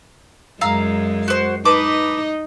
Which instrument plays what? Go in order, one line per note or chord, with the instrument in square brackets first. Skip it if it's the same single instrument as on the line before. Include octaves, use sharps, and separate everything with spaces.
[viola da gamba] F#2 G#3 [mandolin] F5 A#5 E6
[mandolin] F#4 C5
[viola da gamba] D#4 D#5 [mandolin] B4 A5 D6